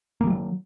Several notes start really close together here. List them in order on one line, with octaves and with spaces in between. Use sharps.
A#3 D#3 G3 F#3